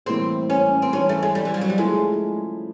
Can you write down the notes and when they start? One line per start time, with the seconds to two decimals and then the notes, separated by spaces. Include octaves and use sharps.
0.06 A2 E3 G3 A#3 C4
0.50 C#4
0.82 C4
0.92 E3 G3 B3 C#4 D4
1.09 A3
1.23 G#3
1.35 G3
1.45 E3
1.54 F3
1.61 F#3
1.70 G3
1.78 C#3 F3 G#3 A3 C#4 E4